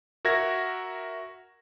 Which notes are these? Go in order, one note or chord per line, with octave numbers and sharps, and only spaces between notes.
F#4 A#4 E5 G#6 A#6